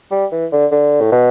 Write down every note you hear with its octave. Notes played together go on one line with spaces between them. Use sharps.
G3
E3
D3
D3
A2
B2